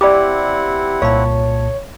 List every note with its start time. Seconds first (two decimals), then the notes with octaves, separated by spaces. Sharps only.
0.01 C4 E4 G4 D5 F#5 B5 D6
1.02 C2 A#2 C#5 F5 A5